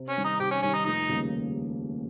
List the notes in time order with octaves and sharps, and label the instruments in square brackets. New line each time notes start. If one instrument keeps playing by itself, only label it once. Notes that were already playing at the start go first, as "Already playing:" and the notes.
Already playing: [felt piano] C3
[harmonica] C#4
[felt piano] D#3 G3
[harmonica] D#4
[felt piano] C3 [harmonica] G4
[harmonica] C#4
[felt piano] D#3 G3 [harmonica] C#4
[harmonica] D#4
[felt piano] F1 [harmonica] D#4
[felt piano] D#2 C#3 G3 A#3